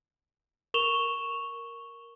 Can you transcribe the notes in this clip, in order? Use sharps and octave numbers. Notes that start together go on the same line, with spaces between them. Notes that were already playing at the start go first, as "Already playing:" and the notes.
A#4 C#6 E7 F7 G7